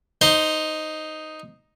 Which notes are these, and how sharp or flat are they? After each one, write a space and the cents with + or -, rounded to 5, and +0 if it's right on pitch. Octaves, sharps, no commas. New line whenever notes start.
D#4 +0 C5 +0